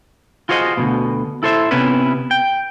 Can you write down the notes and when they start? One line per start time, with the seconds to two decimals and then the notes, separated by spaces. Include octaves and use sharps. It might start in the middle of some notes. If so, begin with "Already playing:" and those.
0.49 F4 F#4 G#4 C5 D5 D#5
0.77 D2 G#2 B2
1.43 E4 A4 C5 E5
1.71 C3 B3 C#4 E4 B4
2.31 G5